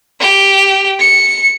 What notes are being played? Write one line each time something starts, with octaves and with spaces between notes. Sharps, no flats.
G4
C#7